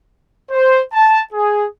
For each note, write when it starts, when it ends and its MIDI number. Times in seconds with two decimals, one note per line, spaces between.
0.51 0.83 72
0.93 1.23 81
1.33 1.66 68